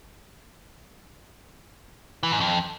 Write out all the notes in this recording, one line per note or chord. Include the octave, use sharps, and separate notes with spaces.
E3
G#2
F2